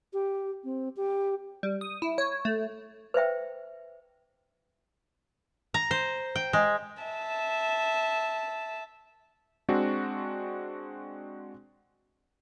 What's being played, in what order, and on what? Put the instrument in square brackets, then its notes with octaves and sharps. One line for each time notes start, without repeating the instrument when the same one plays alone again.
[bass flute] G4
C4
G4
[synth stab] G3
D#6
E4
C#5
A3
[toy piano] B4 C5 E5 G5
[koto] A#5
C5
G5
G#3
[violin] E5 A5
[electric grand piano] G#3 C4 D4 F#4